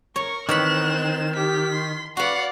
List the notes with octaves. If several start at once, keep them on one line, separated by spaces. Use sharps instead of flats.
A#4 C#5 C#6
D#3 E3 C4 C#5 B5 F#6 E7
G4 B6
C6
F#4 B4 D5 F5 F#5